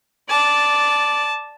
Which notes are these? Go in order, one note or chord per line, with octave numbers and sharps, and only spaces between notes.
D5 A5